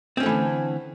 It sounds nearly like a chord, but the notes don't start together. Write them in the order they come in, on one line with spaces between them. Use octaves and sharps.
C4 C#4 A3 E3 D3